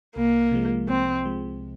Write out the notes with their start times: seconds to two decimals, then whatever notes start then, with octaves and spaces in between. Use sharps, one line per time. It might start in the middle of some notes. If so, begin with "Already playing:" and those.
0.16 C2 A#3
0.51 C3 F3 G#3
0.88 C2 C4
1.24 C3 F3 G#3